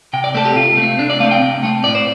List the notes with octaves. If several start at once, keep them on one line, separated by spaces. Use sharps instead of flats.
C3 G5
D5
A3 C4 A4
G4
C3 F4
A3 C4
C3 D4
D5
A3 C4 F5
G5
C3
A3 C4
A2 D5
C5